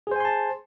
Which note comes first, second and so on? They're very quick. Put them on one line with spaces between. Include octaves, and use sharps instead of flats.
G#4 C5 G#5 C6 A5